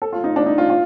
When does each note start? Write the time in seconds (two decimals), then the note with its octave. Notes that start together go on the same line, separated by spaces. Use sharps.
0.02 A4
0.13 F4
0.24 D#4
0.36 D4
0.46 D#4
0.58 F4
0.70 F4